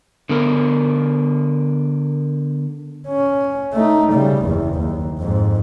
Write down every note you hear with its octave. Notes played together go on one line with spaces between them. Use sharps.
D3 B3 A#4
C#4
A3 D#4
C#3 G3
F#1 E2
D#2
F2 G#2